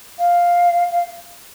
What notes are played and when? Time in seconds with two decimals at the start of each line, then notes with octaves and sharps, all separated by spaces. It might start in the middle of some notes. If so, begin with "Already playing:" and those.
0.19 F5
0.91 F5